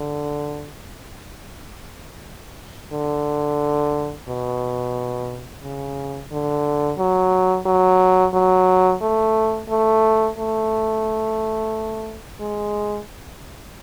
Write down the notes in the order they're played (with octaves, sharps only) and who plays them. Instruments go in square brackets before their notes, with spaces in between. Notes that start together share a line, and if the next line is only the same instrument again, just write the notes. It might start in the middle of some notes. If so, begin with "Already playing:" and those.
Already playing: [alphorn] D3
D3
B2
C#3
D3
F#3
F#3
F#3
A3
A3
A3
G#3